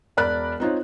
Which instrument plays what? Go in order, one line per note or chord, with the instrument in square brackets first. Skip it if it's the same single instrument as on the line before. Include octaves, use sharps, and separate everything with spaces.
[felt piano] E1 A#4 D5 B5 F#6
C4 D#4 F4 C#5